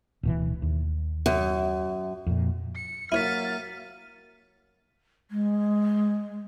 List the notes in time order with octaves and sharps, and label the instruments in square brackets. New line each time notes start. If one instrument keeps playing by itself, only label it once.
[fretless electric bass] D1 B2 E3
D#2
[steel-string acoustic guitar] F#2
[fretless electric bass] F2 A#2
[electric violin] C#7
[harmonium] F#3 A#3 [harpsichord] E4 C#5 [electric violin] F6 A6 [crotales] B6 D#7
[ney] G#3